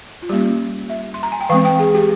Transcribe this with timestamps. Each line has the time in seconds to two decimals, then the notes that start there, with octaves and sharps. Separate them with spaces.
0.22 F4
0.29 G3 A#3 C#4 G4
0.90 E5
1.14 C6
1.23 A#5
1.32 G#5
1.41 G5
1.49 E3 G#3 C4 F5
1.65 G5
1.79 G#4
1.95 G4